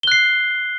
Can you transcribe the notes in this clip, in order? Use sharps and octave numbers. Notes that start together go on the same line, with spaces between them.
F#6 C7 G7